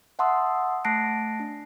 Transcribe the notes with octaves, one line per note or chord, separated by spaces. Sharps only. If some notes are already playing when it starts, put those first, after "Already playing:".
E5 F#5 A5 C6 D#6 E6
A3 A5 F#6 A#6 C7 D7
D4